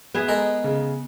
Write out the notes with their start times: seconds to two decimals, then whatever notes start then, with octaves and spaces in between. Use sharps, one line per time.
0.14 B3 G#4 E5
0.28 G#3 A4 A#4
0.64 C#3